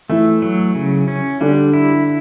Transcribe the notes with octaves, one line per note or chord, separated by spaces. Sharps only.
E3 A3 E4
F#3
C#3
C#4
D3 G3 D4
E4